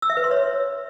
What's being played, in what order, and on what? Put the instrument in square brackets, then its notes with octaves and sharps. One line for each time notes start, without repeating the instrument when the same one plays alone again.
[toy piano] E6
E5
B4
C6
C#5